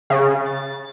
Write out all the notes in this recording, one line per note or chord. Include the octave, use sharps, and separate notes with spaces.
C#3
A6